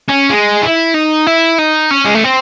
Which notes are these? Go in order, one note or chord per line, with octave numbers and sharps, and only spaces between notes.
C#4
G#3
E4
D#4
E4
D#4
C#4
G#3
A3
C4